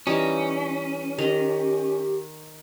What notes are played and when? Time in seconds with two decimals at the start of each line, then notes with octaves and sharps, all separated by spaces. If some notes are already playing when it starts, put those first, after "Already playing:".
0.07 E3 G3 C#4 D#4
1.18 D#3 G4 D#5 A#5